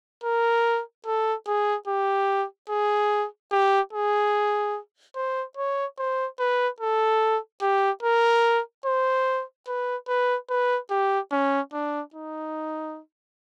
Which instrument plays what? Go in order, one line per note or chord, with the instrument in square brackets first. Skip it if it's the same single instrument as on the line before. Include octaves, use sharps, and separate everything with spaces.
[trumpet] A#4
A4
G#4
G4
G#4
G4
G#4
C5
C#5
C5
B4
A4
G4
A#4
C5
B4
B4
B4
G4
C#4
D4
D#4